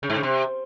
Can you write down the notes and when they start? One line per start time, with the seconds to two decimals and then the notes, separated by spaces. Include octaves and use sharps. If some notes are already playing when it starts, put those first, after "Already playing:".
0.03 C#3
0.10 G#2
0.16 C#3
0.23 C3